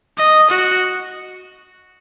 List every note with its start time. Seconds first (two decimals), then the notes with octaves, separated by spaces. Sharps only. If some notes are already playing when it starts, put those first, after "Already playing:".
0.18 D#5
0.51 F#4